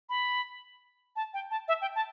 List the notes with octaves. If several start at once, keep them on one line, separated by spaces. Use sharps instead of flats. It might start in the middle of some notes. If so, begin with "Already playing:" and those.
B5
A5
G5
A5
E5
G5
A5